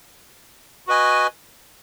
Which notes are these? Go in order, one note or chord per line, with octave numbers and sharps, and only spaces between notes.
F#4 B4 D#5 G#5